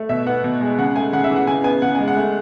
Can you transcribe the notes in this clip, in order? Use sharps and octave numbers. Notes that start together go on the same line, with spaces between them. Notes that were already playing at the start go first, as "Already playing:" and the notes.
Already playing: A3
B2 E5
B3 F#5
B2
G#3
C#3 F#5
A3 G#5
C#3 F#5
E5
E3
F#5
C#3 G#5
B3 G#5
C#3 F#5
G#3 G#5
F#5
A3